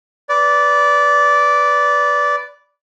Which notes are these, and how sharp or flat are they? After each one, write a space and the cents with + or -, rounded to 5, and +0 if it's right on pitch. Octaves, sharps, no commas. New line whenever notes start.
B4 +0 D5 -15